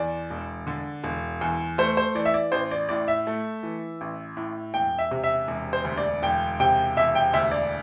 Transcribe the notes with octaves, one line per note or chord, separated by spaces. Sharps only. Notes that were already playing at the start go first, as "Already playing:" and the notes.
Already playing: E2 D5
E1
D3
E1
E2
A3 C5
C5
E3 D5
E5
D5
A1 C5
D5
A2 D5
E5
A3
E3
A1
A2
E1 G5
E5
C3
E5
E1
C5
D2
D5
E1 G5
C3 G5
E1 E5
G5
D2 E5
D5